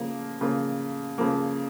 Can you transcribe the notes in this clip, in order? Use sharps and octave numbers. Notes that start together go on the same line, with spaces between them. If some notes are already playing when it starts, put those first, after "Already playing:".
Already playing: C#3 F3 A#3
C#3 F3 A#3
C#3 F3 A#3